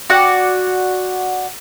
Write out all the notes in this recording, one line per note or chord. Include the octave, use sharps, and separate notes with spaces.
F#4 D5 F#5